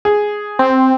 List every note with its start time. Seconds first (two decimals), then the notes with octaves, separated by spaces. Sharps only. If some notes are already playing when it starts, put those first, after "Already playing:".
0.05 G#4
0.59 C4